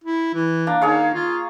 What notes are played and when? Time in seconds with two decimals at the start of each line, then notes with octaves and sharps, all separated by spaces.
0.04 E4
0.34 E3
0.67 A#3 D4
0.81 D#3 G#4 C#5 F5
1.14 F4